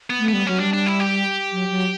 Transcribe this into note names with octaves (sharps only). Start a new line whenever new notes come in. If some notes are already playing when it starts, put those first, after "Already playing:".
B3
A3
G3 B3
F#3 C#4
G3 D4
D4
E4
G4
F#3
F#3